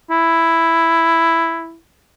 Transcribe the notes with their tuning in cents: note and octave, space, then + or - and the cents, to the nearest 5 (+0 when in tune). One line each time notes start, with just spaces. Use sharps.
E4 +5